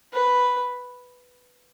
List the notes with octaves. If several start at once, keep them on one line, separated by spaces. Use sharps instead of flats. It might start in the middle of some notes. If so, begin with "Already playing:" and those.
B4